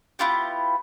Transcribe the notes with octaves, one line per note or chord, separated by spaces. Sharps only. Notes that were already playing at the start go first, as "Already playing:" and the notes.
B3 E4 F4 G4